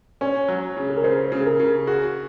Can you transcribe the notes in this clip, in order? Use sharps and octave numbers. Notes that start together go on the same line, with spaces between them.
C#4 C#5
F#3
C#3
G#4
A#4
C#3 C5
C#3
G#4
A#4
C#3
F#4 G#4